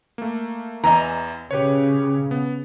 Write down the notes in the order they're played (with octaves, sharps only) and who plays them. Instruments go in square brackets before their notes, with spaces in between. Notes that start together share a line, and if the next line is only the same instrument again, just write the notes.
[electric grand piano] A3 A#3
[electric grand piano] E2 E3 [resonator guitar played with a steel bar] D#5 G#5 A#5
[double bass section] C#3 [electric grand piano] G4 B4 C#5
[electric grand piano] B3